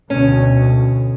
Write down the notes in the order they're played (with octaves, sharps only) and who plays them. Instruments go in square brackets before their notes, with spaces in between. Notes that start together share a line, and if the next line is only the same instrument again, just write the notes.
[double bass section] D2 B2 [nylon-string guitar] C#4